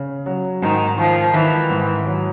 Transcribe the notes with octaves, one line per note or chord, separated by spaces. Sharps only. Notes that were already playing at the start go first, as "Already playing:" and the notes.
Already playing: C#3
F#3
G#2 D#3
D#3 F3
D#3 E3
G#2
F#3